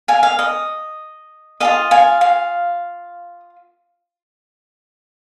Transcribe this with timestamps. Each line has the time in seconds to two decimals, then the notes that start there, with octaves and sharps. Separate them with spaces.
0.08 F5 G#5
0.23 F5
0.39 D#5
1.60 F4 G#4 D#5 F5
1.91 F5 G#5
2.21 F5